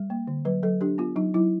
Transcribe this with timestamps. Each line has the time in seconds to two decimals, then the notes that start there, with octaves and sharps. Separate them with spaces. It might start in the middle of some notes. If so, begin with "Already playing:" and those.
Already playing: G3
0.10 A#3
0.27 D3
0.45 F#3 B4
0.63 F#3 A4
0.81 D4 G4
0.98 B3 F4
1.16 F#3 D#4
1.34 F#3 E4